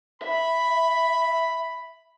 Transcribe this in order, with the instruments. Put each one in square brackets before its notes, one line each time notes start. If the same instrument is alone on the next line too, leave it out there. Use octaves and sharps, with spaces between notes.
[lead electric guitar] E5 [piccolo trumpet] B5